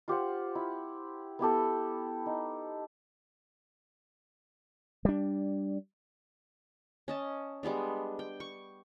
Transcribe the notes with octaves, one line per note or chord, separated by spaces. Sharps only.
F4 G4 C5 F#5
E4
B3 E4 G4 A4
D#4
G3 D4
C#4 D#5 A5
G3 G#3 B3 D4
G5
C#6